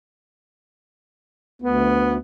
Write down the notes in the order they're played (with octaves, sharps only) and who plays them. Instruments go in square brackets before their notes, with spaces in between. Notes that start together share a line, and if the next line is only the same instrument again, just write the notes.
[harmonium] D2 [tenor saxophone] B3